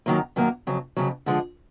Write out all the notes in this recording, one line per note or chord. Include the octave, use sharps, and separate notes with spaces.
F#2 D#3 F#3 A#3
F#2 D#3 F#3 A#3
F2 C#3 F#3
F2 C#3 F#3
D3 F3 G#3